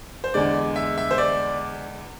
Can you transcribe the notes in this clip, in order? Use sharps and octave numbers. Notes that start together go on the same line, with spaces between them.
C5
E2 D3 G#3 D5
E5
E5
C5
D5